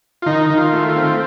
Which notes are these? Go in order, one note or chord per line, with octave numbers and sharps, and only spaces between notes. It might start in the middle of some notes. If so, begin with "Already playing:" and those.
F4
D#3 D#4
D#3
F4
A3
F4
C4